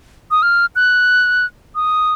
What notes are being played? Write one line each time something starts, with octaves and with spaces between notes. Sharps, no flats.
D#6
F6
F#6
D#6